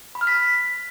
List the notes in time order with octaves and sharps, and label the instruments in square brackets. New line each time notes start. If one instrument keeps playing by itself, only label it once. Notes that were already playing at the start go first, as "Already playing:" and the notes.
[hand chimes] B5
F6
B6